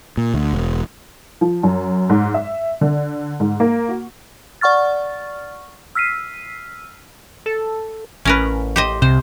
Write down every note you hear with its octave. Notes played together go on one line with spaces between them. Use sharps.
A#2
D2
E1
F3
F#2
G#2
E5
D3
G#2
A#3
F#4
D5 F#5 C#6 F6 A6
E6 F6 B6 C7 D#7
A4
A1 C#4 A#4 B4
G4 C5 D#5
C2 C3 C5